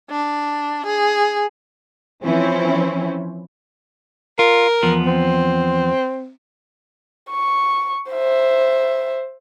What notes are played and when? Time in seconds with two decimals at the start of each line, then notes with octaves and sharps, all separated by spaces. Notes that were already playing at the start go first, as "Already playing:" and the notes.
0.11 D4
0.86 G#4
2.24 E3 F3 C4 C#4 E4
4.39 F4 A#4
4.83 E2 F3 B3
5.06 C4
7.31 C#6
8.11 C5 E5